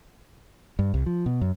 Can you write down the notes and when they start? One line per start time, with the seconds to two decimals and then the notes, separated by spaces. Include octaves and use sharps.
0.79 G2
0.94 C2
1.06 F3
1.26 B2
1.41 F#2